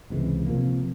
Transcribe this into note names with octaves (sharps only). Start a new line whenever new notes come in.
C#2 C3 E3 G#3
C3 F3 A#3